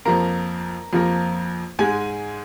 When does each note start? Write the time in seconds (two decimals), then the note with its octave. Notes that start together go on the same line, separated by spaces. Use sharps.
0.05 F2 F3 A#3 A#4 A#5
0.93 F2 F3 A#3
1.79 G#2 G#3 G#5 G#6